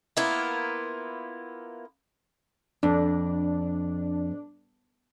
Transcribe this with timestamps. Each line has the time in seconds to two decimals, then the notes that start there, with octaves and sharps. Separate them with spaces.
0.17 A#3 B3 E4 F4
2.83 F2 D4